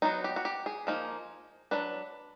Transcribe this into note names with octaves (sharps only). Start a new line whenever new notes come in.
F#3 B3 D#4 F#4
G4
F#4
G4
G#4
F3 A#3 D#4
F#3 A3 D4 B4